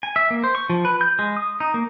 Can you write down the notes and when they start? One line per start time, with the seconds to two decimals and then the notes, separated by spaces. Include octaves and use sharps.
0.03 G#5
0.16 E5
0.30 A#3
0.44 C5
0.55 C#6
0.70 F3
0.85 B4
1.01 G6
1.19 G#3
1.37 D#6
1.60 D#4
1.74 A#3